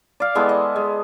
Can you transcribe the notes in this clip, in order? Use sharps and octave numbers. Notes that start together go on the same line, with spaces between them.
D5 F5
E3 G#3 B3 A4
D#5
G#3